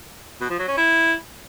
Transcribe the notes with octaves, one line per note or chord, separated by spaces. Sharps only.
B2
F3
F#3
C#4
E4